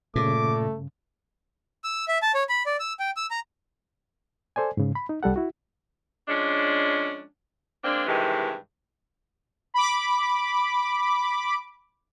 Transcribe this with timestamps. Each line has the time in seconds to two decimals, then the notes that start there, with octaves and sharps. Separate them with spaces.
0.16 G2 A#2 C#3 A3 D6
1.84 E6
2.08 E5
2.22 A5
2.34 C#5
2.49 B5
2.66 D5
2.80 E6
2.99 G5
3.17 E6
3.31 A#5
4.56 A4 C5 D5 G#5
4.77 G#2 C#3
4.95 B5
5.09 D#4
5.23 C2 G3 A4 F#5
5.36 E4 F#4
6.28 F3 G#3 C#4 D4
7.83 G#3 A#3 C4 D4
8.06 G2 C3 D#3 E3 G#3
9.74 B5 D6